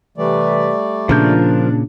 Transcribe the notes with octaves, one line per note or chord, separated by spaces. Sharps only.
C3 E3 G3 A3 B4 D5
A#2 C#3 F3 D4 A#4 G6